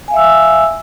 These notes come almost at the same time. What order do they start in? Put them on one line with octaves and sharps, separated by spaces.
G#5 F5 E5 E6